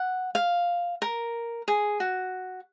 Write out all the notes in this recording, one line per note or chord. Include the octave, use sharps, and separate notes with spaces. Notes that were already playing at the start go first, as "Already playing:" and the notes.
Already playing: F#5
F5
A#4
G#4
F#4